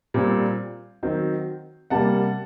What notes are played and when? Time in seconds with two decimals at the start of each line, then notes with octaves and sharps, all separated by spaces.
0.14 A#2 G3 C4
1.03 D#3 F#3 C4
1.90 C3 G3 A#3 F#5 A5